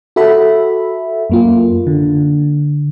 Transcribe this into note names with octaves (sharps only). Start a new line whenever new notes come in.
F#4 A4 E5 B5
F#2 A#3 F4
D3